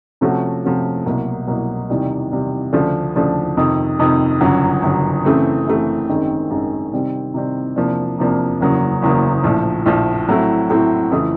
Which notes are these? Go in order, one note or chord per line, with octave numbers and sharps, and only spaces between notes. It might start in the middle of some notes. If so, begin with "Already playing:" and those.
C3 F3 A3 C#4 F#4
C3 F3 A3 C#4 F#4
C2 B2 F#3 A#3
C2 B2 F#3 A#3
E2 C3 D#3 G3
E2 C3 D#3 G3
D2 C#3 F3 A3 D4
D2 C#3 F3 A3 D4
F2 C3 D#3
F2 C3 D#3
G1 F#2 C#3 F#3
G1 F#2 C#3 F#3
F#2 C#3 E3 A3 C4
F#2 C#3 E3 A3 C4
G#1 F#2 D#3 G#3 C4
G#1 F#2 D#3 G#3 C4
C3 D#3 G3 C4
C3 D#3 G3 C4
E2 C3 F3 A#3 D4
E2 C3 F3 A#3 D4
F#1 E2 C#3 F#3 A#3
F#1 E2 C#3 F#3 A#3
A#1 A2 F3
A#1 A2 F3
A2 F#3 A3 C4 E4
A2 F#3 A3 C4 E4
F2 C#3 E3 A3